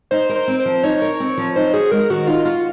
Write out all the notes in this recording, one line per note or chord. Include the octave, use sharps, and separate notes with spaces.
D#4 C5
A#4
C5
C4
C5
F3
D#4 C#5
A#4
C4
F3
D#4 C5
F#4 G#4
G#3 A#4
D#3 F#4
D#4 F4
F4 F#4